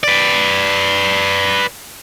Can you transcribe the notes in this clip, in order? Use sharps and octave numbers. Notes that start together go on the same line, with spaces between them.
B4 D5